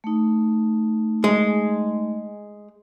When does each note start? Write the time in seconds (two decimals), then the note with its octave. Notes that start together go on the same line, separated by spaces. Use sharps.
0.04 A3 D#4
1.24 G#3